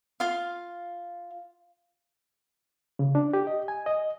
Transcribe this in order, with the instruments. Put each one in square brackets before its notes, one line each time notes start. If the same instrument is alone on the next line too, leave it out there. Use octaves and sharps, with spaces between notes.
[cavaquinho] F4 F5
[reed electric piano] C#3
D4
G4
D#5
G#5
D#5